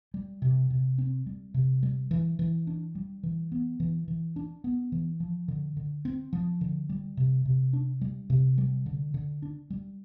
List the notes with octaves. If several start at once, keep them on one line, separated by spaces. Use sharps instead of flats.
G3
C3
C3
C4
G3
C3
G3
E3
E3
D4
G3
E3
B3
E3
E3
D4
B3
E3
F3
D3
D3
C4
F3
D3
G3
C3
C3
D4
G3
C3
G3
D3
D3
D4
G3